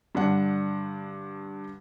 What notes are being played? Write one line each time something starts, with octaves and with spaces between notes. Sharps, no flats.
G2 D3 D4 F#5